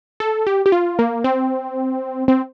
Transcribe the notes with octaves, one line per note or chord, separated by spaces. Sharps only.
A4
G4
G4
F4
A#3
C4
C4